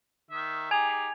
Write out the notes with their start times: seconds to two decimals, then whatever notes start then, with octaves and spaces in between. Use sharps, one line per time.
0.31 D#3 E5
0.71 D#4 G4 G#4 G#5 G#6 F7